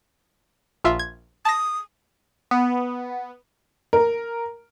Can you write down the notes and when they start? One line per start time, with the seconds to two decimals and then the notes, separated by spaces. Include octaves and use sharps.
0.84 A#1 F4 E5
0.99 G#6
1.45 A5 D#6 A#6
2.51 B3
3.93 A#4